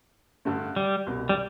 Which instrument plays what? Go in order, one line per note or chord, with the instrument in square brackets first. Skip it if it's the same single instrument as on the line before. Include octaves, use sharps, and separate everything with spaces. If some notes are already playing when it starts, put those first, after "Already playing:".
[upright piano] G2 D3 A3
[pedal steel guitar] G3
[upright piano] C2 B2 G3
[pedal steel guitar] G3